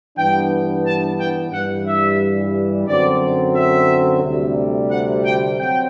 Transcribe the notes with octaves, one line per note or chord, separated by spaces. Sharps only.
G2 E3 B3 D4 G5
A5
G5
G2 E3 G3 F#5
E5
F#2 D3 F#3 C4 D5
E5
D2 C3 G3
F#5
G5
F#3 C4 G5